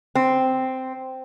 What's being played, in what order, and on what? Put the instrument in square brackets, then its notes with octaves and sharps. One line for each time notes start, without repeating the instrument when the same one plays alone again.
[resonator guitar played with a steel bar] C4